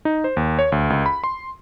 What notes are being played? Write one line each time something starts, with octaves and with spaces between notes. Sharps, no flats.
D#4
C5
D#2
C#5
D2
C#2
B5
C6